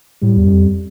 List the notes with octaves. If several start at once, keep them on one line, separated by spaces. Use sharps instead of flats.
A2 G3
E2
F#2
F2